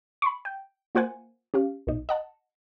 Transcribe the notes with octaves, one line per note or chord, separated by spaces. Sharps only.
B5 C#6
G5
A#3 F4 C5 F#5 G#5
C#4 G4 F5
B1 D#4
D#5 F#5 A5